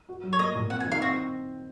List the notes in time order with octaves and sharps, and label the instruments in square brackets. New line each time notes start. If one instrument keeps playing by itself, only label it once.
[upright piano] F#4
F#3
[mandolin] C#5
[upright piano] A#3 [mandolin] D#5
[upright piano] A#2
[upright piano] C4 [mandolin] F#5
[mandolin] G#5
[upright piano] D#3
[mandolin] F5
[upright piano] C4 [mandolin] F#4